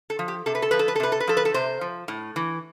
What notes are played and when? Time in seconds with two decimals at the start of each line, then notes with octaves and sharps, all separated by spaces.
0.10 A4
0.19 F3
0.28 G4
0.46 C3 A4
0.55 B4
0.62 A4
0.71 F3 B4
0.79 A4
0.88 B4
0.96 A4
1.00 C3 B4
1.12 A4
1.20 B4
1.27 F3 A4
1.37 B4
1.45 A4
1.54 C3 C5
1.81 F3
2.08 A2
2.36 E3